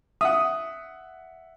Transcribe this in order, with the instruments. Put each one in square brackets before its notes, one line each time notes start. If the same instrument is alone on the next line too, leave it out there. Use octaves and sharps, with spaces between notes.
[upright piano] E5 F#5 [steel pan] D#6